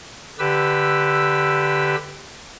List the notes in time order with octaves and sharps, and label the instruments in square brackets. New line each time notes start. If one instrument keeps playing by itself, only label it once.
[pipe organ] D3 G4 B4 E6